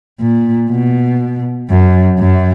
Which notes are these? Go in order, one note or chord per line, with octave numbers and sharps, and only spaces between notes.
A#2
B2
F#2
F#2